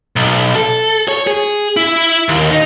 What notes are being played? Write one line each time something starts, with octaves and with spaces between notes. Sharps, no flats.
B1
A4
C#5
G#4
E4
D#2
D#4